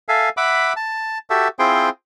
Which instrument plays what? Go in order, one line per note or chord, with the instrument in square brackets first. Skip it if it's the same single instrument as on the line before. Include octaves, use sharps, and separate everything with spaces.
[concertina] A4 E5 F5 G#5
E5 F#5 B5 D6
A5
F#4 G4 A4 E5
C4 E4 F4 G#4 C5 G5